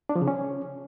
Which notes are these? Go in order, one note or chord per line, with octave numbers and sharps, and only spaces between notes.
D4
F3
C#3
C#4